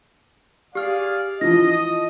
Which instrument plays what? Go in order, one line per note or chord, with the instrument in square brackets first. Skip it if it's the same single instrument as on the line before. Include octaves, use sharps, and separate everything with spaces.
[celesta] G4 F6 [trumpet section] G#4 D5 F5
[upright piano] E3 F3 [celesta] F4 A#6 [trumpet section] D#5